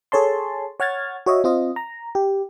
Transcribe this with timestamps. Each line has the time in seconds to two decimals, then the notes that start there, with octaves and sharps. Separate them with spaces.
0.12 G#4 A4 C#5 A5 C6
0.80 C#5 F#5 F6 G#6 A6
1.26 F#4 C#5 D#5 E5
1.44 C4 F4 D#5
1.76 A#5
2.15 G4